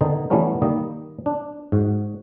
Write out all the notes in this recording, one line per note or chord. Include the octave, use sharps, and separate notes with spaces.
D3 D#3 B3 D#4
E3 G3 A3 B3 C#4 A#4
D#3 G3 A#3 D#5
D4
G#2 F#4